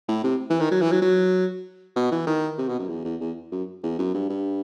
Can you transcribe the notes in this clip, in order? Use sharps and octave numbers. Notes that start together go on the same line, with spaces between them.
A2
C3
E3
D#3
F#3
E3
F#3
F#3
B2
E3
D#3
C3
B2
F#2
E2
E2
E2
F#2
E2
F#2
G2
G2